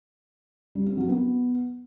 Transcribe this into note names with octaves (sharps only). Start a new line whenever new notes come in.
G3
C4
F#3
B3